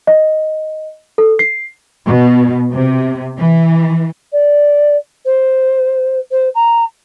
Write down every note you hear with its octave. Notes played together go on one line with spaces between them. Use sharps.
D#5
A4
C7
B2
C3
E3
D5
C5
C5
A#5